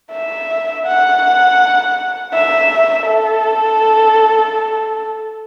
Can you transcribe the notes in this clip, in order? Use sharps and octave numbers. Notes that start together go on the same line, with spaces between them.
E5
F#5
E5
A4